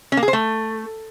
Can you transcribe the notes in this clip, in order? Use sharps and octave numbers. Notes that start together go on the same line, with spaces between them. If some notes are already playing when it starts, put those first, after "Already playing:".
C#4
A#3
G#4
C5
A3